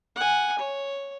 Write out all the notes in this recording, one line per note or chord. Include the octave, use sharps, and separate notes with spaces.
F#5 G#5
C#5